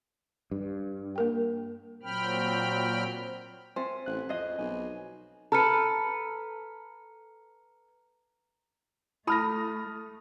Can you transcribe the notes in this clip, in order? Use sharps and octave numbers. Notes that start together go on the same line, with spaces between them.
G2
A#3 A#4 G5
A#2 F#3 C4 G5 B5 F6
C4 C5 E5 G#5
A1 F#6
F2 G#4 C5 D#5
B1 G#5
A4 B4 A#5 F6 C#7
A3 E4 A5 B5 D#6 F6 A#6